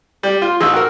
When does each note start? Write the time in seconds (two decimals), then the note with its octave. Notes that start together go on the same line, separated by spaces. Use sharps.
0.23 G3 D5
0.42 F4 C6
0.60 A1 D#4 G#4 E6
0.74 F#4 A#4